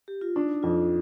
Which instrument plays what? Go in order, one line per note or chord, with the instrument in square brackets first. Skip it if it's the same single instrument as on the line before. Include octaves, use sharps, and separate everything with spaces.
[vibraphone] G4
F4
[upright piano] D4 [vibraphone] D#4
[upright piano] F2 [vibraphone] F4